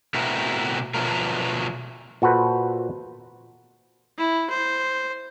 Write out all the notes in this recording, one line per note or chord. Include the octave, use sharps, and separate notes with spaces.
B2 A3 C4 E4 F#4 A#4
B2 F3 F#3 A3 A#4
A#2 F#4 A4 B4 C5
E4
C5